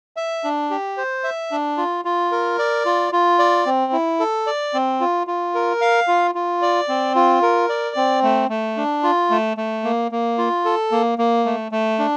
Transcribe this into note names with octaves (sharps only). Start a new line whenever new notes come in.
E5
D4
G4
C5
E5
D4
F4
F4
A#4
D5
F4
F4
D5
C4
E4
A4
D5
C4
F4
F4
A#4
F5
F4
F4
D5
C4
F4
A#4
D5
C4
A3
A3
D4
F4
A3
A3
A#3
A#3
F4
A4
A#3
A#3
A3
A3
D4